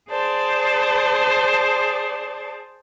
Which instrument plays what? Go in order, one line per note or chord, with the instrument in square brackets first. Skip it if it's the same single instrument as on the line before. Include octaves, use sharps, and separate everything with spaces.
[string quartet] G#4 C5 D5 A5